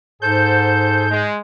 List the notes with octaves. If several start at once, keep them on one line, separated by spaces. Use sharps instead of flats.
G#2 G#4 A4 C5 G6
G#3